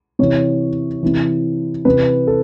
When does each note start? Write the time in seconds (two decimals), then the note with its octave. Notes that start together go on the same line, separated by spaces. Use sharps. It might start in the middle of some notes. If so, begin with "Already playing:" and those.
0.19 C3 E3 C#5
1.03 C3 E3
1.85 C3 E3 B4
2.27 A4